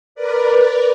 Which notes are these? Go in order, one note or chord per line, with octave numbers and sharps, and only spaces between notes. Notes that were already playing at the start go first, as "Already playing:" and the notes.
A#4 B4 D5